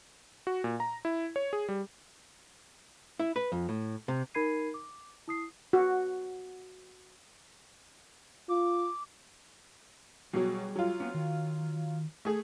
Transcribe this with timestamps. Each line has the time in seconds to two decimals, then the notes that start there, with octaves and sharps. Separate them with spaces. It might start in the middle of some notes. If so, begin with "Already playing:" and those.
0.47 F#4
0.64 A#2
0.80 A#5
1.05 E4
1.36 C#5
1.53 G#4
1.69 G3
3.19 E4
3.36 B4
3.52 F2
3.69 A2
4.08 C3
4.34 D#4 A#4 B5 G#6 C7 D#7
4.74 D6
5.28 E4 D#6 C7
5.73 F#4
8.49 F4 D6
10.33 B2 F#3 G3 G#4 C#5
10.76 F#3 F4
11.00 A#3 B3 C#4
11.14 D#3
12.25 A3 G#4